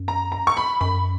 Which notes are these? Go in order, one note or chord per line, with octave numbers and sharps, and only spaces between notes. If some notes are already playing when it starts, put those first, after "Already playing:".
Already playing: F#2
A#5
A#5
C#6
B5
F#2 B5